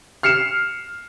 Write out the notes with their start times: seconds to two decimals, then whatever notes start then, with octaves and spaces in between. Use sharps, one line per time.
0.23 F6 C7 C#7 E7